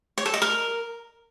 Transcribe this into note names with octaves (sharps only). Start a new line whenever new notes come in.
C#5
A4
D#5
A#4